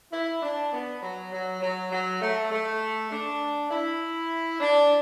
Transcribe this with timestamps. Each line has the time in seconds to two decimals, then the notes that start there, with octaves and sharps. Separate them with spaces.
0.12 E4
0.42 D4
0.72 B3
1.02 F#3
1.32 F#3
1.62 F#3
1.92 F#3
2.21 A3
2.52 A3
3.11 D4
3.71 E4
4.61 D4